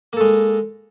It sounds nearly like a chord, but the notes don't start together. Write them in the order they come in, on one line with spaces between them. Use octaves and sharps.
A#3 A4 G#3